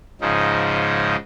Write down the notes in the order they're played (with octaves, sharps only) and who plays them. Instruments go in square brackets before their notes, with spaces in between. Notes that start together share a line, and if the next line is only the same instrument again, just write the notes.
[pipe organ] G#2 C#3 F3 D#4